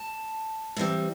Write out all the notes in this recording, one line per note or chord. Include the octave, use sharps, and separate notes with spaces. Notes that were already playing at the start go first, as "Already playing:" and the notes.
Already playing: A5
A2 E3 G3 C4